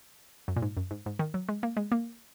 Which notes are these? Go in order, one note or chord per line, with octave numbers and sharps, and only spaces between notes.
F#2
A#2
G#2
F#2
G#2
G#2
D#3
F#3
G#3
A#3
G#3
A#3